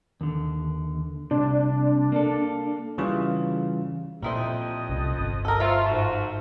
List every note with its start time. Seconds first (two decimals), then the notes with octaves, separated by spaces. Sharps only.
0.21 D#2 D3
1.31 C2 C3 D4
2.12 A#3 A4
2.98 C#3 E3 G3 F4
4.22 F2 A#2 G3 E4 C5 D#5
4.89 C2 C3 C#4
5.18 G1
5.45 A4 A#4
5.60 B3 F4 C5 C#5 E5
5.84 G#2 F3 A3 F#4